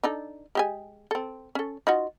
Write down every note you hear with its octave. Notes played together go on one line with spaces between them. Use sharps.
D4 D#4 A4
G#3 G4 G#5
C4 A4
C#4 A4
D#4 F4 F#4